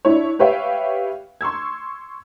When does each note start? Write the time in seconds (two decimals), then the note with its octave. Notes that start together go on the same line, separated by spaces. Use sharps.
0.05 D4 E4 C#5
0.39 G4 B4 C#5 E5 F5 G5
1.41 C6 C#6 E6 G#6